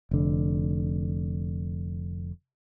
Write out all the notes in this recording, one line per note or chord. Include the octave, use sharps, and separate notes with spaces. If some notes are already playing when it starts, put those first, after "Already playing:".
F1 D3